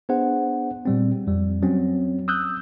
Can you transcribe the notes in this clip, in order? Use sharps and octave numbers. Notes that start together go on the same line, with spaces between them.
B3 D4 G#4 C5 F#5
A#2 G3 C4
F2 G3
F#3 C4 C#4
D#6 E6 F#6 G6